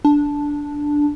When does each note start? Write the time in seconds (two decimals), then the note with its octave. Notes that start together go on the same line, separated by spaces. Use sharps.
0.05 D4